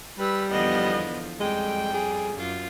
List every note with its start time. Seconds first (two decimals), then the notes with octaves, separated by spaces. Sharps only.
0.19 G3 B4 E6
0.50 E2 D3 F3 B3 D#5
1.40 F2 G3 G#3 G5
1.94 G#4
2.34 F#2 F4